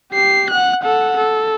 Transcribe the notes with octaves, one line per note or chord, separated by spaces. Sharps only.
G4 C7
F#5 F#6
A4 F#5
A4